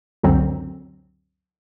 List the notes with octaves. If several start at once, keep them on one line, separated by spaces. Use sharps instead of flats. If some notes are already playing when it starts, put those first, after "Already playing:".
C#2 F#2 D3 F#3 C4